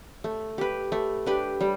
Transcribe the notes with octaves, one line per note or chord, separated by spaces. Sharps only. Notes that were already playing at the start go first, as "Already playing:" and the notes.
A3
G4 B4
A3
D4 G4 B4
G3